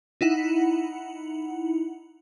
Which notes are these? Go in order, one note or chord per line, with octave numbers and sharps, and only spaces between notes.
D#4 E4 F#5